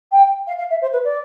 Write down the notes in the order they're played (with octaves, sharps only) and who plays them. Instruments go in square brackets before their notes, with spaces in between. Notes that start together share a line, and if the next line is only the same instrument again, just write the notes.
[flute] G5
F5
F5
E5
C5
B4
D5